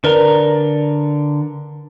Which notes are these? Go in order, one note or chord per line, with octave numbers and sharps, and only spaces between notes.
D3 A#4 B4 D5 A#5